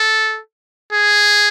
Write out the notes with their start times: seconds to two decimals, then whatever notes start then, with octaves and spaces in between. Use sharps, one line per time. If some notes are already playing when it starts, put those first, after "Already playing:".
Already playing: A4
0.93 G#4